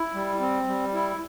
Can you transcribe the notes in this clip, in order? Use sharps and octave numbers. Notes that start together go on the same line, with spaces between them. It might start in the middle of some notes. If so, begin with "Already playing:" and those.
Already playing: E4
G3
C4
G3
E4